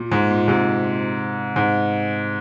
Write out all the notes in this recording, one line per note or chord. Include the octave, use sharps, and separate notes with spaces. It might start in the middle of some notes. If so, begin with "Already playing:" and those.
Already playing: A#2
G#2
A#2
G#2 C3
G#2